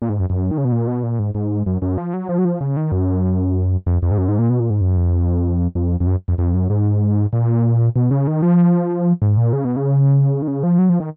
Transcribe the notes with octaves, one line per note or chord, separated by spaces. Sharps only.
A#2
G#2
F#2
F#2
D#3
C#3
B2
A#2
B2
A#2
G#2
G#2
F#2
F#2
F3
F#3
F3
F#3
F3
C#3
D#3
F#2
F2
F2
G#2
F#2
G#2
A#2
B2
A#2
G#2
F#2
F2
F2
F2
F#2
F2
F2
F#2
G#2
A#2
B2
C#3
D#3
F3
G#2
A#2
C#3
B2
C#3
D#3
C#3
F3
F#3
F3
D#3